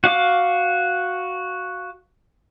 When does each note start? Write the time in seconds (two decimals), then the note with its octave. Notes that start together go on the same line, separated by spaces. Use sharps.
0.04 F#4 F5 D6